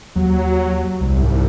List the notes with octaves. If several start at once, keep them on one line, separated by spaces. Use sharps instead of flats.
D#2 F#3
C2
G#2